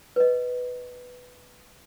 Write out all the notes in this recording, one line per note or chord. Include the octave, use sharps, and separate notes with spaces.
B4 D#5